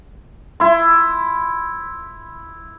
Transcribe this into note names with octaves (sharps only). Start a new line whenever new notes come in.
E4 C6